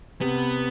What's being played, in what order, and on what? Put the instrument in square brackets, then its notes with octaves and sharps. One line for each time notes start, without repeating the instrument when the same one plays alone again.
[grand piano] C3 [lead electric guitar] B3